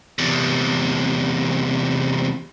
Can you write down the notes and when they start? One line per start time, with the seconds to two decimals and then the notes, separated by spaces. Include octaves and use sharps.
0.19 E2 C3